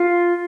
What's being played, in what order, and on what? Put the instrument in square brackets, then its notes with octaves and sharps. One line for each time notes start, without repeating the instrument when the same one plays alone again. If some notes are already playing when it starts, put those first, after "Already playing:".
Already playing: [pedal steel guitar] F4